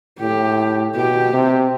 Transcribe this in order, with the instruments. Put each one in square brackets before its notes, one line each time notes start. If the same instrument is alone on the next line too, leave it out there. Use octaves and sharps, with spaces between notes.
[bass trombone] A2 [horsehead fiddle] G4
[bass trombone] B2 [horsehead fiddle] G4
[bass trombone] C3